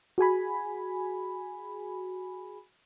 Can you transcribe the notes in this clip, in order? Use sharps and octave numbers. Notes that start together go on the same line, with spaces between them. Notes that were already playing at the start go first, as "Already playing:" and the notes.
F#4 G#4 G#5 B5